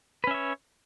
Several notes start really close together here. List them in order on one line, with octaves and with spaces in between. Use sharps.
B4 C#4 E5 C#5